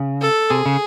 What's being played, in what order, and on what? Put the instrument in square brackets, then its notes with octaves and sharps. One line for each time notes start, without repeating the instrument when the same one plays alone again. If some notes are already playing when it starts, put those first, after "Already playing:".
Already playing: [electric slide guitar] C#3
[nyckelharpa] A4
[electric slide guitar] C3 [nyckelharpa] G#4
[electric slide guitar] C#3